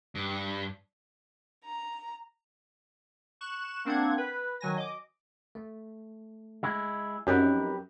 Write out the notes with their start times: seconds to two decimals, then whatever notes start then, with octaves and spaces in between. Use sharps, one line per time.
0.15 G2
1.64 A#5
3.41 C#6 F#6 E7
3.85 A#3 C4 D4 F#5 G#6
4.18 B4
4.60 D#3 F#3 G#5 A#6
4.77 D#5 D6
5.55 A3
6.63 G#3 E4
7.27 F#2 F3 C4 D#4 G4 A#4 B4